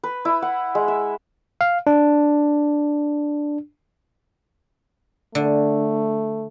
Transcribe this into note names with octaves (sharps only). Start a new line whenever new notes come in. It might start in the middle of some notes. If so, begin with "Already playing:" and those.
B4
E4
F#5
G#3
E5
F5
D4
D3 A3